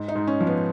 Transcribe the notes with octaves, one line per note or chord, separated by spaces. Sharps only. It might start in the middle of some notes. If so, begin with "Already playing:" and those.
Already playing: G#2
D#4
G#2
C#4
F3
B3